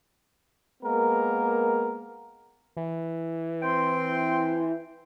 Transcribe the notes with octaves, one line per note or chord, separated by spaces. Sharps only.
G#3 A#3 B3 A#4
E3
C4 G5 C6